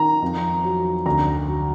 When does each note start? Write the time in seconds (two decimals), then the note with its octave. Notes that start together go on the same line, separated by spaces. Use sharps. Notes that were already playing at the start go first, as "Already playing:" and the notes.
Already playing: D#3 A#5
0.22 F2
0.64 F#3
1.06 D2 A#5
1.48 F#3